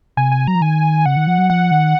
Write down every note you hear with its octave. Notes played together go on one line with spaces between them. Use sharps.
C3 G#5
G#5
F#3 A#5
F3
D#3 G#5
C#3 F#5
D#3
F3
F#3
F3 F#5
D#3